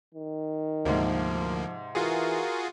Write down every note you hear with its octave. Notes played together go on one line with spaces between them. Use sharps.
D#3
D2 G#2 C3 F3 A#3
E3 F4 F#4 G#4 A#4